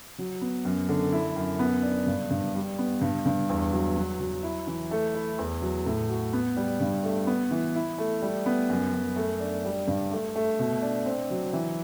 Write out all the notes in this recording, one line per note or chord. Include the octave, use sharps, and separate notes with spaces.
F#3
B3
F#2
D3
E4
F#2
B3
D4
G2
G2
G3
B3
G2
G2
E2
F#3
F#3
F#3
E4
E3
A3
E4
E2
F#3
A2
F#4
B3
G3
G2
A3
B3
E3
E4
A3
G3
B3
F#2
F#2
A3
D4
G3
G2
A3
A3
B2
D4
C4
F#3
E3